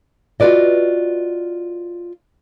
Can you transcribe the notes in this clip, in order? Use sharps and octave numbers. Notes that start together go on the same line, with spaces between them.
F4 F#4 A4 B4 D5 D#5